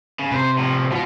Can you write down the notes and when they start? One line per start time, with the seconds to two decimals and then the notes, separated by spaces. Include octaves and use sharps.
0.19 C#3
0.32 C3 B4 C5
0.58 A2 F3
0.92 B2 F4 F#4